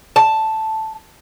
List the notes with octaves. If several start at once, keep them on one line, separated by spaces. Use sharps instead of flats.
A5